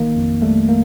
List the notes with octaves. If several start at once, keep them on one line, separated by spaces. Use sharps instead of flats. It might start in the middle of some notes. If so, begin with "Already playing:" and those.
Already playing: A1 D#3 A#3
F2
G3 A3
A#3